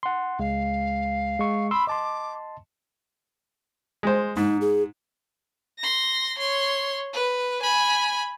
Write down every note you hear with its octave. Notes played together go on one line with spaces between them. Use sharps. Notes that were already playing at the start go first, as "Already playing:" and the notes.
F#5 C6
C#2 G#3 F5
G#3 C#6
B5 C6 E6
D#5 A5 C6 D6
G#3 C5
G#2 D#4
G#4
C6 A#6
C#5 C6
B4
G#5 B5